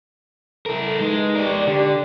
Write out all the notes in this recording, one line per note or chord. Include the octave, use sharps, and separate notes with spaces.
E4 A4 A#4
G#3 D#4 B4
G4 A#4 D5
D3 G4